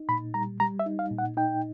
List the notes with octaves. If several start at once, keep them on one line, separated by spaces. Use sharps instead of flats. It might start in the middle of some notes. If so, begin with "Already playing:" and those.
Already playing: D#4
A#2 B5
G3 A#5
G3 A#5
E5
D#4
F5
A#2
F#5
D#4 G5